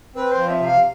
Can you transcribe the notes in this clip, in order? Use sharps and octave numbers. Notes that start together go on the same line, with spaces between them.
C4 B4
C5
F3
E5
C3 F5